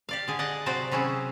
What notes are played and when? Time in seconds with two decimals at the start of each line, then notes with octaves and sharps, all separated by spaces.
0.09 G4 D5 F5
0.28 D3 G#4
0.39 D5 D#5 F#5
0.66 C3 F#3 F#4 C5 D5
0.92 C3 F#3 C#4 E4 G#4